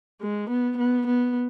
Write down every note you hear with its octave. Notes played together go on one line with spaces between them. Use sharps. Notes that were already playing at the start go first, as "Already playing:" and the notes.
G#3
B3
B3
B3